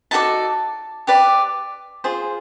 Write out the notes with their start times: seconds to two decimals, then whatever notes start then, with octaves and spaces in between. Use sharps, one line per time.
0.11 D#4 F#4 A4 D5 A5
1.07 G4 B4 D5
2.04 F4 G#4 C5